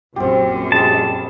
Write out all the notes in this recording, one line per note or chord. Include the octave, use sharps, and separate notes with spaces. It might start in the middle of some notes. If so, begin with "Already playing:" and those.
A#1 F#2 C4 G4
G3 G#3 A5